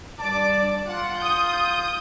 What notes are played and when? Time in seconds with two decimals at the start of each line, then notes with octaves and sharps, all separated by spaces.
0.20 G2 D5 A5 D6
0.87 F4 F#5
1.19 D#6 G6